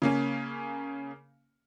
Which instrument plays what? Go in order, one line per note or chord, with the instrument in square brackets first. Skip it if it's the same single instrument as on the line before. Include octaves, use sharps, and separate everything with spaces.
[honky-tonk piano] C#3 A#3 C#4